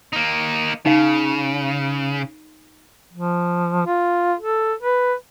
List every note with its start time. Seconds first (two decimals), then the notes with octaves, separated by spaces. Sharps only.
0.13 A#3 D#4
0.86 C#3 D#4 F5
3.13 F3
3.86 F4
4.40 A4
4.82 B4